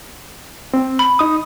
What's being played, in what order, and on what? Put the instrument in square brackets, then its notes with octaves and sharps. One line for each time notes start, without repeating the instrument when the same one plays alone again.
[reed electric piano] C4
[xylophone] B5
[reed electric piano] D#4 D#6